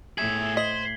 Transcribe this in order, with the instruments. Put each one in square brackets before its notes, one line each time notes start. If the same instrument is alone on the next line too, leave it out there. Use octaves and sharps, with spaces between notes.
[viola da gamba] A2 [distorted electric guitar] G#4 E5 [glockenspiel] G#6
[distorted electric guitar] C5 [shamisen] D#5 [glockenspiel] B6 F#7 G7